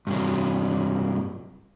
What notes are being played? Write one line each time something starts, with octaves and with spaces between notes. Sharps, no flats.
G2 C3 F#3